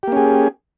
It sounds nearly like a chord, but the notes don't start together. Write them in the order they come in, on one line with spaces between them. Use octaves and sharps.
G4 A#3 C#4 G#4